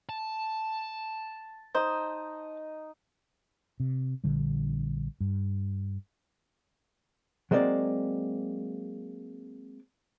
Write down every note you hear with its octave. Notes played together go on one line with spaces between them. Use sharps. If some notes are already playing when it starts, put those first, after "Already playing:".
A5
D#4 C5 D#5
C3
A#1 D3 G3
G2
F#3 G#3 A#3 C4 D5